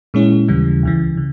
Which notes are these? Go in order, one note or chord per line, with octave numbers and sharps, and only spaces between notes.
A#2 G#3 C#4 E4
D#2 C#3 E3 G3
C#2 C#3 E3
C#3